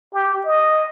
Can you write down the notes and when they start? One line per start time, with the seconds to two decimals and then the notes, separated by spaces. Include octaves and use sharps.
0.14 G4
0.46 D#5